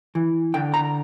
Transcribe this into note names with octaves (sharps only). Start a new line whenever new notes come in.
E3
D3 G5
A#5